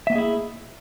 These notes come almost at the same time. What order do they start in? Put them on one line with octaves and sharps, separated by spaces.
E5 A#3 D#5 G#4 E4